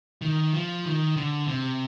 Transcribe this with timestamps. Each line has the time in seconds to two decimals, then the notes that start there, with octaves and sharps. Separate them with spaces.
0.22 D#3
0.53 F3
0.86 D#3
1.17 D3
1.48 C3